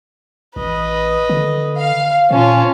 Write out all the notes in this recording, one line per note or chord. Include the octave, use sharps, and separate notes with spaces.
A1 B4 D#5
D3
F5
A#2 C#4 F4 A5